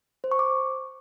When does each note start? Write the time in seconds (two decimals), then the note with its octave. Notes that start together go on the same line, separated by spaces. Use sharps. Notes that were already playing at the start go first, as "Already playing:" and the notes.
0.24 C5
0.31 C#6
0.39 D6